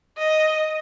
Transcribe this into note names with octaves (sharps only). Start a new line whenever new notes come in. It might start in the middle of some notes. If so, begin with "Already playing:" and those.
D#5